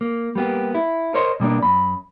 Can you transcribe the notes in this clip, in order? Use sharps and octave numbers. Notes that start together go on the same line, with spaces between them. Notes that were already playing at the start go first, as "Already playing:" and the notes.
A#3
G3 A#3 B3 G4
E4
A#4 C5 C#5 D#5 C6
B2 G3 A#3 D4
F#2 B5